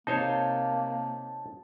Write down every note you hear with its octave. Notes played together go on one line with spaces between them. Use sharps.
C3 A#3 D#4 C5 C#5 A5